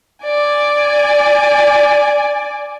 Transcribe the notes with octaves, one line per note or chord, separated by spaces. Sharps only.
D5 G#5